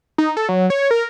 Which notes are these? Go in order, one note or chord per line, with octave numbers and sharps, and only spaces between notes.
D#4
A4
F#3
C#5
A#4